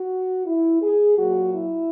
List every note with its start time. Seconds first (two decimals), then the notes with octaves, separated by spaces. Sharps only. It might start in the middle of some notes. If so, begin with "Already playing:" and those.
Already playing: F#4
0.46 E4
0.82 G#4
1.18 A#2 F#3 F#4
1.54 E4